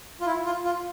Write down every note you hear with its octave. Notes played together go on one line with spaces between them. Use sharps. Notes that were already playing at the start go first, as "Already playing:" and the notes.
F4
E4
F4
F4